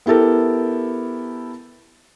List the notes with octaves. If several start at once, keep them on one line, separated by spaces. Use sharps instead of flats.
B3 E4 G4 A4 A#4